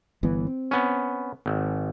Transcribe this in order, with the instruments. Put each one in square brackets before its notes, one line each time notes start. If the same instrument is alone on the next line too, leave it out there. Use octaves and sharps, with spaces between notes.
[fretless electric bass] G1 E3 B3
C4
[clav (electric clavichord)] B3 C#4
G#1